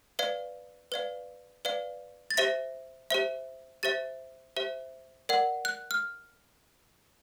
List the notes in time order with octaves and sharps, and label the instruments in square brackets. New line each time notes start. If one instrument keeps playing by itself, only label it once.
[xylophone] B4 D5 F5
B4 D5 F5
B4 D5 F5
A6
G4 C5 E5 A#6
G4 C5 E5
G4 C5 E5 A6
G4 C5 E5
A#4 D5 F#5
F#6
F6